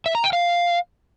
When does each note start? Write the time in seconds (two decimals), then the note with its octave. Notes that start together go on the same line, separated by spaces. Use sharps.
0.06 E5
0.15 A#5
0.24 G5
0.33 F5